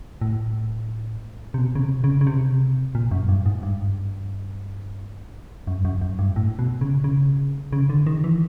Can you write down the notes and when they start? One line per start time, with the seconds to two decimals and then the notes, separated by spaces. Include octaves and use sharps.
0.21 A2
1.54 C3
1.58 B2
1.75 C#3
1.81 C3
2.04 C#3
2.21 C#3
2.27 C3
2.95 A#2
3.11 F#2
3.29 G2
3.46 G#2
3.63 G2
5.67 F#2
5.80 G2
5.85 F#2
6.01 F#2
6.19 G2
6.36 A2
6.59 B2
6.81 C#3
7.04 C#3
7.73 C#3
7.90 D3
8.07 D#3
8.24 E3